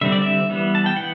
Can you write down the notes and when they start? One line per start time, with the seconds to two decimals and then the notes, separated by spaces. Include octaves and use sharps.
0.01 D3 G3 C4 E5
0.12 D5
0.22 E5
0.50 E3 G3 B3
0.75 A5
0.86 G5
0.96 E3 B3 F#5